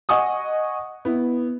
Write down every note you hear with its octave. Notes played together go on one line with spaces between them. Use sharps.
D#5 F#5 G#5 C#6 D#6
B3 E4